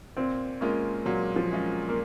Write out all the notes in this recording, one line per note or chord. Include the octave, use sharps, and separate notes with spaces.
A#2 C4
G#3 A#3 C#4 F4
A#2 F#3
F3
G#3 C#4 F4
A#3